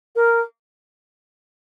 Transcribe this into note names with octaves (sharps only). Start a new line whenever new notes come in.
A#4